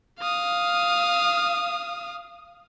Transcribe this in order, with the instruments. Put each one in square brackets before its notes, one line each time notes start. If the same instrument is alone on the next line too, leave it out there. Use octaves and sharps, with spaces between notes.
[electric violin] F5 D#6